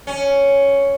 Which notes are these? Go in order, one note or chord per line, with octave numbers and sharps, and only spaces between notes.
C#4